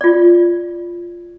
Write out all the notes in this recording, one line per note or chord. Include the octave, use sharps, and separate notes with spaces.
F4 D5